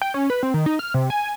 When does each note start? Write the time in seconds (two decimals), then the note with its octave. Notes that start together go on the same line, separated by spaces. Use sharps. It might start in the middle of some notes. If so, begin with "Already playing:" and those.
0.01 G5
0.14 C#4
0.30 B4
0.43 C4
0.54 D#3
0.66 D#4
0.79 F6
0.94 C3
1.10 G#5